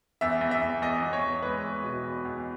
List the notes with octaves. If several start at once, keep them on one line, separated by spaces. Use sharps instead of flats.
E2 E5
E2
E5
E2
E2 D#5
E2
C#5
E2
G#3 B4
E2
B2
E2
E2